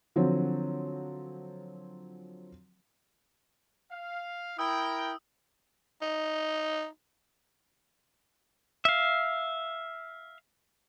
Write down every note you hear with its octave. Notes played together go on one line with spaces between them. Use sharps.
D3 F3 F#3 C4
F5
E4 A#4 G5 D#6 E6
D#4
E5 F5